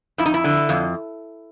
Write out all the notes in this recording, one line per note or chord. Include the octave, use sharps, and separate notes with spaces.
F2 E4
D#4
E4
D3
F2